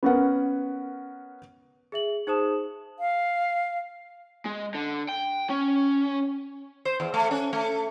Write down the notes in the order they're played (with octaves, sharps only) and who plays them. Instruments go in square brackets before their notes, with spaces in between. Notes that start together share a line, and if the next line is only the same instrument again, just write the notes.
[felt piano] B3 C#4 A#4 F#5
[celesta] G#4 E5 F#7
D#4 G#4 C5 A5 D#6 E7
[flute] F5
[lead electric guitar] G#3
D3
G5
C#4
[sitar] C5
E2
A3
C#4
A3